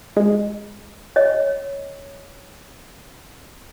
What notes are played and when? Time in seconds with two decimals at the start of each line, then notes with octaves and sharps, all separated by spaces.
0.17 G#3
1.16 C#5 D#5